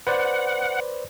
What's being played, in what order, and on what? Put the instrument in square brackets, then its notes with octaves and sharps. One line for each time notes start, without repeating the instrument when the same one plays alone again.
[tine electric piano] B4 C5 D5 [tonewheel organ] F#5